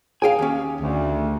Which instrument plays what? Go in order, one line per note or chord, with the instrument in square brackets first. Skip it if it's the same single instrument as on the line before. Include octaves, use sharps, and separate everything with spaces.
[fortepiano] G#4 [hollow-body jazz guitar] F5 G5 G#5
[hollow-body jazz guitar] D#2 C#4
[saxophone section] D2